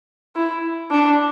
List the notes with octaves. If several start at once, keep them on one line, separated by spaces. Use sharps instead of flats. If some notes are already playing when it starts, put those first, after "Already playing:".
E4
D4